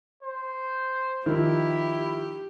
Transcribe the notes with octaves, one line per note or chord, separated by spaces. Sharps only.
C5
D#3 F3 E4 G4